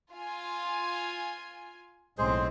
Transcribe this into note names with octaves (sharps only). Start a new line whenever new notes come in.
F4 G#5
B1 A2 G#3 C4 G#4 C5